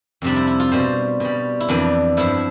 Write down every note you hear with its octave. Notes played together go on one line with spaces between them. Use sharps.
F2 C3 G3 D4
E4
E4
F4
B2 G3 C5
B2 G3
E4
F2 E3 G3 D4
G2 F3 E4